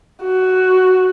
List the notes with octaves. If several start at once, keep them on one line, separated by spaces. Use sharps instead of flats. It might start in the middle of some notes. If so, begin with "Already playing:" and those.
F#4